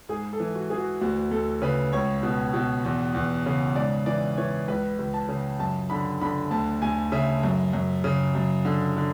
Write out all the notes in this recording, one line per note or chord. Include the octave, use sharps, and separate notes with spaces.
G#2 G#4
A4
E3
F#4
E3 G#4
F#4
D2 F#4
D2 A4
C#3 B4
C#2 C#5
B2
B2
E2
E2
C#3
G#2 D5
E3 D5
E3 C#5
C#2 B4
C#2
A5
C#3
F#2 A5
D3 B5
D3 B5
D2 A5
D2 G#5
C#3 E5
F#2
F#2
C#3
F#2
D3
D3